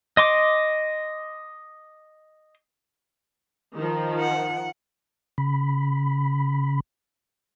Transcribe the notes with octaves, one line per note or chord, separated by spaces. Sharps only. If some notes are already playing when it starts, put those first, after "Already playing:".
D#5 C6 D6
D#3 F3
F#5
C#3 B5